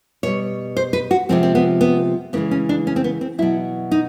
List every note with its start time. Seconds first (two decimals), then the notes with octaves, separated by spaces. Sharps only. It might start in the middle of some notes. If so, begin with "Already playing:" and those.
0.23 B2 G3 C#5
0.77 C5
0.93 B4
1.11 F#4
1.29 C3 F3 G#3 C4
1.43 C4
1.55 B3
1.81 B3
2.33 C#3 E3 G#3 B3
2.51 C#4
2.69 D4
2.87 C#4
2.96 C4
3.04 B3
3.21 C4
3.38 B2 F#3 E4
3.91 D#4